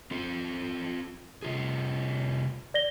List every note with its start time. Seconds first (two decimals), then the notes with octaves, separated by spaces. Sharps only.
0.11 C4 F4 A4
1.42 C3 F4 G#4
2.74 D5 A#6 G7